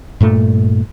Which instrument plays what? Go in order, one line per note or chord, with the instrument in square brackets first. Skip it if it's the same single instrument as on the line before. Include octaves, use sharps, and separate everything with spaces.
[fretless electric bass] G2 A#2 A3